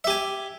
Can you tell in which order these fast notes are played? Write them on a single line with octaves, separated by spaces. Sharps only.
E5 G4 G#5